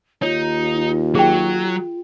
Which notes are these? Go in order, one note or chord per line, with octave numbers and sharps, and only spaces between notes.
D#2 D#4 F4 C#5
F#3 G#4 G5